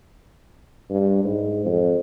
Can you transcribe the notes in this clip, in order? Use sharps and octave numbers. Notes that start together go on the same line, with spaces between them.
G2
G#2
F2